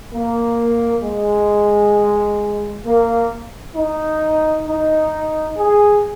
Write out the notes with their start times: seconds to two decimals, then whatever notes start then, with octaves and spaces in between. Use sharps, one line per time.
0.13 A#3
1.03 G#3
2.86 A#3
3.76 D#4
4.67 D#4
5.58 G#4